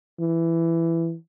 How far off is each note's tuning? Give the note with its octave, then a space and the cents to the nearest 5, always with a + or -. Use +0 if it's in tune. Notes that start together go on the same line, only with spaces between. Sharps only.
E3 +10